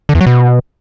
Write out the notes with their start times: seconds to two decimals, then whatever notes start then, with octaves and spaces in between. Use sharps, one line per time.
0.09 D3
0.15 E2
0.21 F#3
0.26 B2